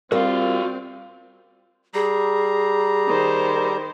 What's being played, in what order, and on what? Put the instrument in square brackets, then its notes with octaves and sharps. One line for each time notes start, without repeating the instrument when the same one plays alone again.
[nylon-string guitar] G3 F4 [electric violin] C4 [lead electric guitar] F#4 F5 [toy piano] A#4
[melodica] G3 A#5 [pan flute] G#4
[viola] D#3 C5